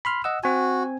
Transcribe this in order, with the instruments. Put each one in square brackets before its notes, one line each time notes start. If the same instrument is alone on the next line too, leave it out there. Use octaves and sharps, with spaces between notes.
[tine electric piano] B5 C6 F6
D#5 F#5 E6
[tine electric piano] C4 G#5 [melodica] F#4